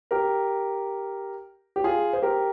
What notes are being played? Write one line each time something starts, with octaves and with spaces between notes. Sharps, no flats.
G4 A#4
G4
F4 G#4
C5
G4 A#4